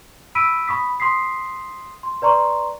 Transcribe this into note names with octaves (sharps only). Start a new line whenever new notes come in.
B5 E6 B6 D7 D#7
B5 C#6 D#6 B6
C6 D#6 B6 C7
C6
B4 D5 A#5 C6 C#6